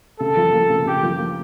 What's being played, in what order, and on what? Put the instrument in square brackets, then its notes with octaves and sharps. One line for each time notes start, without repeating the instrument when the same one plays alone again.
[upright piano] C#3 [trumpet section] A4
[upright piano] F3
A#3
C#3
[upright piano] C#3 [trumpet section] G4
[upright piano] F3
A#3